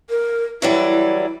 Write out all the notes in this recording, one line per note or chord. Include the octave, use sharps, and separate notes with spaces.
A#4
E3 F#3 G3 E4